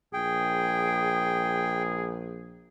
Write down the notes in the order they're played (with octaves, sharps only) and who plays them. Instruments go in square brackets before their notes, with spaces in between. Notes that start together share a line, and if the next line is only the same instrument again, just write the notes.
[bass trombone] A#1 [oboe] G#4 [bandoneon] G5